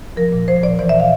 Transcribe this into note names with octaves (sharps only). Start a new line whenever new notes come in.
F3 A#4
A#2
F3 C5
A#2 D5
E3 D5
E5
F5